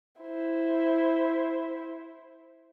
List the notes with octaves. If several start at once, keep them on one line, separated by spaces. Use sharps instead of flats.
E4 C5